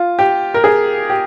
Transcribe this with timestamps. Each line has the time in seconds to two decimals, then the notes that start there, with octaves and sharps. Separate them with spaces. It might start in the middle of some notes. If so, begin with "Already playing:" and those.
Already playing: F4
0.19 G4
0.54 A#4
0.64 G#4
1.10 G4